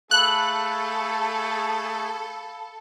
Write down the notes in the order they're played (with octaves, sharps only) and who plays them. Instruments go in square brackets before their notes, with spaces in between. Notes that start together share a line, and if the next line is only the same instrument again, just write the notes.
[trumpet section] A3 G#4 [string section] A4 [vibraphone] F5 B5 E6 [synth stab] F#6